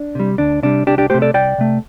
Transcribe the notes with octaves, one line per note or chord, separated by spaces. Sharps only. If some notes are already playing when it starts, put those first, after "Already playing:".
Already playing: D4
C3 G3
D2 D4
C3 G3 D4
C2 D4 G4
D4 G4
C3 A3 G4 C5
A4 D5
C2 D5 G5
C3 A3